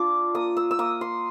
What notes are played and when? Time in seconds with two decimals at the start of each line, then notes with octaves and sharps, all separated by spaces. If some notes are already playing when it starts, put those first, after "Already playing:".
Already playing: D4 F4 D6
0.35 A#3 D#6
0.57 E6
0.71 E6
0.79 A#3 D#6
1.01 C6